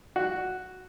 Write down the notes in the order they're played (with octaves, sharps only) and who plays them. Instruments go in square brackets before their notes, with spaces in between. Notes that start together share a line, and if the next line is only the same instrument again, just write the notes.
[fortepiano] F#4